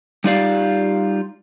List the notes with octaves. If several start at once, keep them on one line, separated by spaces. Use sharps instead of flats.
G3 D#4 F4 G4 D5 F5